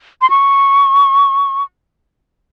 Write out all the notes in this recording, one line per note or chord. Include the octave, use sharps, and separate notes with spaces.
C6
C#6